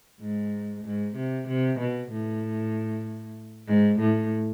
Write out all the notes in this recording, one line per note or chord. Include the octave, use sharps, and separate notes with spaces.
G#2
G#2
C3
C3
B2
A2
G#2
A2